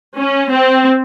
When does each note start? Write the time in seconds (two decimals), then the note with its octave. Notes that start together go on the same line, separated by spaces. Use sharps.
0.17 C#4
0.51 C4